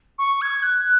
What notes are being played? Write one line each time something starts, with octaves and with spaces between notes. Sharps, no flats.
C#6
G#6
F#6
F#6